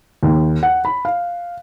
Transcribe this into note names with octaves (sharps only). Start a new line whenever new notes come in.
D#2
F#5
B5
F5